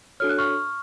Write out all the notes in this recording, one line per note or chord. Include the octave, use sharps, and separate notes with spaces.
D4 F#4 A4 C#5 F6
F#6
C#6 F6